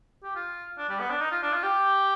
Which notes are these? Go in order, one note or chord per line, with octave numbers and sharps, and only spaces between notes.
G4
F4
D4
G3
B3
D4
D#4
F4
D4
F4
G4